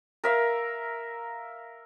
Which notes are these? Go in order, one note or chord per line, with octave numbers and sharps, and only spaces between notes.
A#4 E5 F5